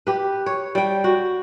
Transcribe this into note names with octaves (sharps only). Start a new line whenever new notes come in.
G4 B4
C#5
G3 G5
F#4